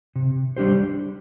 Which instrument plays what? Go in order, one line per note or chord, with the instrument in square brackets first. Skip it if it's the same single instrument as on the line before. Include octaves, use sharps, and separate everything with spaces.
[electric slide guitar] C3
G3 D4 G4 C5